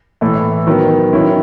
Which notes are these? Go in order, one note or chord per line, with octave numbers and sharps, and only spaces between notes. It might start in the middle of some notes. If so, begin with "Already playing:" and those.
A2 E3 A3 E4 A4
D#3 F#3 B3
D#3 F#3 C#4 E4